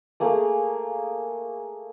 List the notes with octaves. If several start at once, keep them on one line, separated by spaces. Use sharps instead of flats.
A3 A#3 G#4